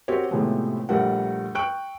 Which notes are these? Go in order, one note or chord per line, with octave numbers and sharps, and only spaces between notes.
C4 F#4 G4 A#4 C#5
A2 C3 F3 G#3 A3 B3
A#1 G3 A3 A#4 F#5
G5 C#6 F#6 D7